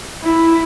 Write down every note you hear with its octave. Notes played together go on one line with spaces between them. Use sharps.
E4